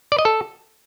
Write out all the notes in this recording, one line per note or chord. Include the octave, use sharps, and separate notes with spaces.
D5
D#5
A4